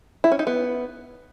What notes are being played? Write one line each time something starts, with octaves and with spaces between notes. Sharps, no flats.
E4
C#4
D#4
B3